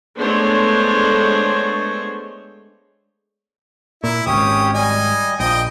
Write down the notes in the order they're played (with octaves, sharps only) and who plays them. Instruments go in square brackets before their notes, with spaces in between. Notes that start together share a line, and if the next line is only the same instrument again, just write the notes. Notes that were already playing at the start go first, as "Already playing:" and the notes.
[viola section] G#3 A3 B3 D4 C5 C#5
[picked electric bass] A#2 [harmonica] E4
[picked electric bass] D1 G#1 [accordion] C#4 G4 [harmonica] D#6
[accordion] G3 D#5 [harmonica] G#5
[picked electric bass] A#1 [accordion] F3 [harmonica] D#5 G5 D#6